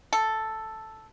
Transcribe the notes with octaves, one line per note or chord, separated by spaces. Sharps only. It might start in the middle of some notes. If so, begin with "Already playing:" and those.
A4